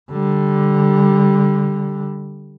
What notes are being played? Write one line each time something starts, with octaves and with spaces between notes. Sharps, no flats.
D3 G3